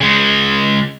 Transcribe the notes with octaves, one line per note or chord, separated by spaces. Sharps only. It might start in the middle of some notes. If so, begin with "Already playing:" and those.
C#3 G#3